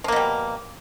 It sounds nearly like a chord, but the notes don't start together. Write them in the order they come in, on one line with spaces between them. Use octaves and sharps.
F3 A#3 B2 G3